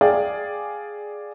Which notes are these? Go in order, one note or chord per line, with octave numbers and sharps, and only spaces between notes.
G#4 D5 F5 G5